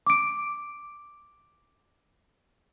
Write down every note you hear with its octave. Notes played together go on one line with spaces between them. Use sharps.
D6 D7